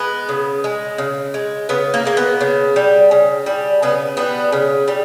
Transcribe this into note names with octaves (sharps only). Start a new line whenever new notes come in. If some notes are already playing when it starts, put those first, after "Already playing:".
Already playing: G#3 B3
C#3
G#3
C#3
G#3
C#3 B3
A#3
G#3 A#3
B3
C#3
G3
C#3
G3
C#3 B3
G3 B3
C#3
G3